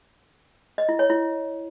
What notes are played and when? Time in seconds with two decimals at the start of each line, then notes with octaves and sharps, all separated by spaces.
0.78 D#5
0.89 E4
0.99 C#5
1.10 E4